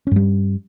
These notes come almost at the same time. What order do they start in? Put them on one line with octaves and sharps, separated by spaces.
C#4 G2 G3